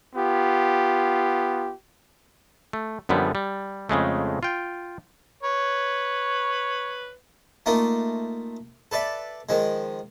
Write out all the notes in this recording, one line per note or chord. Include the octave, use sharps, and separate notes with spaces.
B3 F4 G4
A3
F#2 D3 F3 G3 B3
G3
F2 C#3 G#3 A3
F4 G5
B4 C#5
A3 A#3 D#4 F4
A4 B4 D5 E5
D#3 F3 G#3